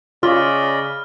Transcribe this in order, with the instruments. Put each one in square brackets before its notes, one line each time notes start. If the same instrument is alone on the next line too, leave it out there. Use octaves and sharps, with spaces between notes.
[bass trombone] C#3 [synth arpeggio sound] F4 [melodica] D5 D#5 B5 [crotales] F6